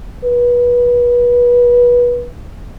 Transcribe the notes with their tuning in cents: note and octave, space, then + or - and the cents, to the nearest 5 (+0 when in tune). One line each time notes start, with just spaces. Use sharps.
B4 -25